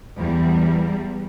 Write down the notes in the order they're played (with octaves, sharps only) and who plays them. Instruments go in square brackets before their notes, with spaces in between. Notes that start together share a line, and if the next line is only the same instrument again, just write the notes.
[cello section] E2 G3